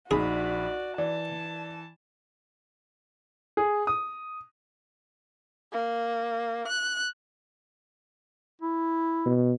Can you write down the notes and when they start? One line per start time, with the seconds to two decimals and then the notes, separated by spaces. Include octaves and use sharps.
0.11 A#1 D#4 F#4 G#4 D5 B5
0.98 E3 D5 A5
3.57 G#4
3.87 D#6
5.73 A#3
6.67 F#6
8.62 E4
9.26 B2